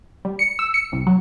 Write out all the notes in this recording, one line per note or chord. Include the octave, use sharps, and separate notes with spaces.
G3
C#7
E6
C#7
C2
F#3